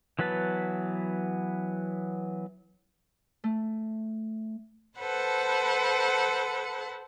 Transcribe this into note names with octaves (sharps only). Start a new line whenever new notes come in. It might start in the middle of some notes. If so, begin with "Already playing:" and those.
E3 F#3 B3 B4 A5
A3
A4 B4 C5 F#5 A5